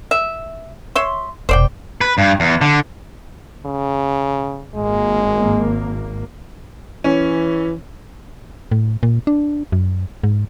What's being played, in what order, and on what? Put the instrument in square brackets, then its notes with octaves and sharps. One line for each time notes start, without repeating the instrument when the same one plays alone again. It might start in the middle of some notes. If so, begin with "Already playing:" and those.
[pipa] E5
C#5 E5 C6
[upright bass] F1 B2 [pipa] C5 D5 G5
[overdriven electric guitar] B4
G2
E2
D3
[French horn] C#3
[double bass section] G#1 A#3 [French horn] G#3
[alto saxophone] E3 [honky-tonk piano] C#4
[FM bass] A2
A#2
D4
F#2
G#2